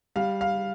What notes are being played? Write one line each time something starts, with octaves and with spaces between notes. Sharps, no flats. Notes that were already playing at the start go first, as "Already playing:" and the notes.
G3 F5
F5